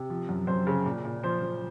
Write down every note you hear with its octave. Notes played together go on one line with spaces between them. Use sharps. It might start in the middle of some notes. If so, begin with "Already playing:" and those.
Already playing: C3
F3
F#2
F#2 C5
C#3
A#2
A#2
F3 C5
F3